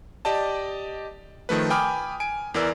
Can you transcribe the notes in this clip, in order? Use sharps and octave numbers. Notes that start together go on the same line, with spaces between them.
G4 D5 D#5 A5
D#3 F3 A3 B4
G5 G#5 B5 D6 D#6 F6
G#5 D7
E2 E3 A#4 D5 E6